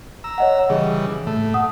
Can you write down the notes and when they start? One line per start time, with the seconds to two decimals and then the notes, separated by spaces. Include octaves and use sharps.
0.24 A#5 E6
0.38 C#5 D#5 F#5
0.70 C#3 E3 G3 G#4
1.27 A2 A3
1.54 F#5 D#6